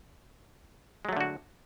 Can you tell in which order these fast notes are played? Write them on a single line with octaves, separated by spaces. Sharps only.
G#3 F#3 A3 D3 F#4